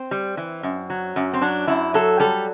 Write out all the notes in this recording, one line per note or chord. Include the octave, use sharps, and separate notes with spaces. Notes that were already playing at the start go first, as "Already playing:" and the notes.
Already playing: C4
G3
E3
F#2
F#3
F#2
C4
F#3 D4
F#2 E4
F#3 A4
G3 A4